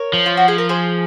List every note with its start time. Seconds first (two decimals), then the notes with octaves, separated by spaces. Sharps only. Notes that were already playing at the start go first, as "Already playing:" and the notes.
Already playing: A#4 C#5
0.13 F3
0.26 F4
0.37 F#4
0.48 G#4
0.58 A#4
0.69 G#4 C5